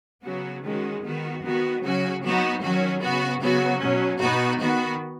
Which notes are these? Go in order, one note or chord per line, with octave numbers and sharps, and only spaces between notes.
C#3 F#3 B3 F#4
D#3 G#3 C#4 F#4
D#3 B3 F#4
D#3 B3 F#4
C#3 F#3 C#4 F#4
F#3 B3 D#4 F#4
D#3 F#3 C#4 F#4
C#3 B3 F#4
C#3 F#3 B3 F#4
B2 F#3 C#4
B2 B3 D#4 F#4
D#3 B3 F#4